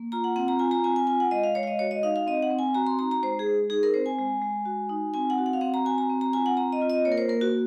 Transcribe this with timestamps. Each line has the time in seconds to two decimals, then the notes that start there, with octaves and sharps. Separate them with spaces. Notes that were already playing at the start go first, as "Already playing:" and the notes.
Already playing: A#3
0.12 F4 A#5
0.24 F#5
0.36 C4 F#5
0.48 A#5
0.59 F4 G#5
0.71 A#5
0.84 C4 G#5
0.96 G#5
1.07 F4 G#5
1.20 F#5
1.31 G#3 D#5
1.44 F5
1.55 G#3 C#5
1.63 F5
1.67 D#5
1.79 F#4 C#5
1.91 D#5
2.03 D#4 F5
2.16 F5
2.27 C4 D#5
2.42 F#5
2.50 C4
2.59 G#5
2.75 F#4 A#5
2.87 C6
2.99 D#4 A#5
3.11 A#5
3.23 G#3 C5
3.39 G#4
3.46 G#3
3.70 D#4 G#4
3.83 A#4
3.94 C4 C5
4.06 G#5
4.19 G#3
4.42 G#3
4.65 F#4
4.89 D#4
5.14 C4 G#5
5.30 F#5
5.38 F#4
5.46 F#5
5.53 F5
5.61 C4 F#5
5.74 A#5
5.85 F#4 G#5
5.98 A#5
6.10 C4
6.21 A#5
6.33 F4 G#5
6.46 F#5
6.57 C4 A#5
6.73 D#5
6.82 F4
6.90 D#5
7.05 A#3 C#5
7.12 A#4
7.18 C5
7.28 A#3 A#4
7.41 F#4